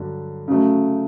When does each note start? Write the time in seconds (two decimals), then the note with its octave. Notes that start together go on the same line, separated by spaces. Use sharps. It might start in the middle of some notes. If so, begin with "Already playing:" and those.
Already playing: G2 D3 F#3
0.48 C#3 F#3 A3